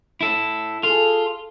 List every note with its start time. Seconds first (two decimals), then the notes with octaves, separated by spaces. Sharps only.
0.21 E4 A4
0.83 F4 G#4 A4